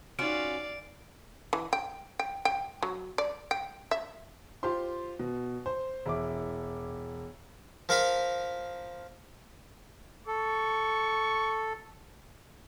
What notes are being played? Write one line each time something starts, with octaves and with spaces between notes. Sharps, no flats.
C#4 D#4 F4 F#4 D5 F5 F6 D7
E3
G5
G5
G5
F#3
D5
G5
E5
F4 G4 C5 C6
B2
C5
E1 E4 D6
F3 A#4 F5 B5
A4 C#6